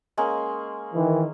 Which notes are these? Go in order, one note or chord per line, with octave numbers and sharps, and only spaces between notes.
G#3 A#3 C#4
D#3 E3